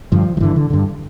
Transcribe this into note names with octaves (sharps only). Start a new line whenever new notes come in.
G2 D3 F3
F3
G2 D3 E3
D3
G2 D3